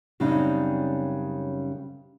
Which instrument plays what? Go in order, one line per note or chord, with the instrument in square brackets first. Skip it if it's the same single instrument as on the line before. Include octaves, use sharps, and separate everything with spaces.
[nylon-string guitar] F#2 C#3 G3 C4 D4 D#4